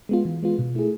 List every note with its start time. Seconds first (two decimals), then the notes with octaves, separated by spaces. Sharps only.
0.09 G#3 B3 F4
0.25 E3
0.43 G#3 B3 F4
0.59 B2
0.75 A3 E4 G#4